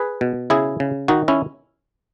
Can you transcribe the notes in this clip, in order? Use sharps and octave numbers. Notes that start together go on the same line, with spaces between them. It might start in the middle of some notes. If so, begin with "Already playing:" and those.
Already playing: G#4 B4
B2
C#3 E4 G#4
C#3
D#3 D#4 F#4
C#4 E4